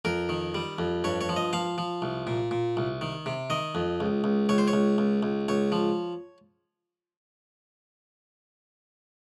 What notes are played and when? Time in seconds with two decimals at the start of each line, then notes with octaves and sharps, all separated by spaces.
0.05 F2 A#4
0.29 D#3
0.55 G3
0.79 F2
1.04 G2 C#5
1.21 C#5
1.29 F3
1.36 D#5
1.53 F3 F5
1.78 F3
2.02 C2
2.27 A#2
2.51 A#2
2.77 C2
3.01 D#3
3.26 C3
3.50 D#3 D#5
3.75 F2
4.00 C#2
4.24 C#2
4.49 C#2 C#5
4.58 C5
4.68 C#5
4.73 C#2
4.98 C#2
5.23 C#2
5.48 C#2 C#5
5.72 F3